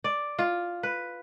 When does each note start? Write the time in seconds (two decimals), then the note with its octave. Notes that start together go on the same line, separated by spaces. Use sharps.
0.04 D5
0.39 F4
0.83 B4